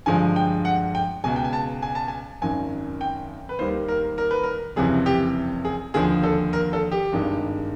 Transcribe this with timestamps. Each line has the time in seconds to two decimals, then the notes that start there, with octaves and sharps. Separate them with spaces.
0.06 G2 D3 F3 G#3 G#5
0.36 G5
0.65 F#5
0.95 G5
1.24 C#2 B2 G#3 G#5
1.36 G5
1.44 G#5
1.53 A5
1.82 G#5
1.95 A5
2.08 G#5
2.41 G#1 F#2 D#3 G#5
3.01 G5
3.49 B4
3.59 D#2 D#3 G3 A#3 C5
3.88 A#4
4.18 A#4
4.31 B4
4.43 A#4
4.76 F#1 F2 C3 E3 G#4
5.06 G4
5.65 G#4
5.94 D#2 D3 F3 G#4
6.23 A4
6.53 A#4
6.73 A4
6.92 G4
7.12 G#1 G2 D#3 G#3